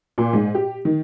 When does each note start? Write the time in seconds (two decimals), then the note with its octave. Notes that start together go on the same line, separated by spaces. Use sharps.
0.18 A#2
0.33 G#2
0.54 G4
0.85 D#3